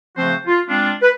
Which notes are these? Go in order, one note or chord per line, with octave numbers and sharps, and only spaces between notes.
C#3 F3 A3 C4 F#4 C5
F4
G#3 C4 D4 F4
B4